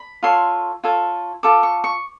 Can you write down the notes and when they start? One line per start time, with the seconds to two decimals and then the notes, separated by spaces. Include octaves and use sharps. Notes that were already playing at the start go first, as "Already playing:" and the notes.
Already playing: B5
0.23 F4 A4 C#5 C6
0.84 F4 A4 C#5
1.43 F4 A4 D6
1.63 C#6
1.84 C#6